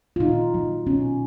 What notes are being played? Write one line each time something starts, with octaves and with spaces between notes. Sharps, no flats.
F4
A#2 D#4
F#3
B2 C#4